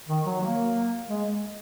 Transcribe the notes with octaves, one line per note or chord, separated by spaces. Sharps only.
D#3
F#3
A#3
G#3